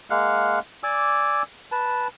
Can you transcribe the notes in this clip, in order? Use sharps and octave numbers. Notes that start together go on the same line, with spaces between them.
G#3 A#3 F5 F#5
D5 G#5 D6 E6
B4 A5